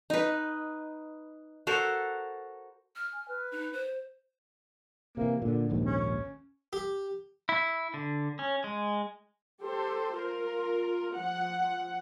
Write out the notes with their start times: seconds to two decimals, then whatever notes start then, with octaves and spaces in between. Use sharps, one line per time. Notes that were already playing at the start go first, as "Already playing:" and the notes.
0.10 D#4 B4
1.67 F#4 A4 A#4 C5
2.96 F6
3.13 G#5
3.28 B4
3.52 D#4
3.73 C5
5.17 C3 E3 A#3
5.42 A#2 D3
5.70 A#1 D#2 G#2
5.85 C#4
6.73 G4
7.49 E4
7.94 D3
8.39 C#4
8.64 G#3
9.63 G4 A4 C5
10.15 F4 A#4
11.15 F3 F#5